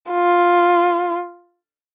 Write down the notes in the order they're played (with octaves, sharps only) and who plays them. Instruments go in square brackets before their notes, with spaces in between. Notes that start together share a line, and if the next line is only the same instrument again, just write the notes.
[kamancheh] F4